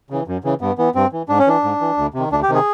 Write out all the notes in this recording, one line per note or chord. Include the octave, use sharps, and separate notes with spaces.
C#3 E3
F#2
C#3 E3
G2 B3
E3 B3
G2 C4
E3
G#2 D4
C#4
E3 D4
G#2
E3
D2
C3 D#3
D2 D4
G4
C3 D#3
G#4